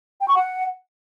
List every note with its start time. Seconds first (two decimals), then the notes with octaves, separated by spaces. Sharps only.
0.21 G5
0.28 C#6
0.35 F#5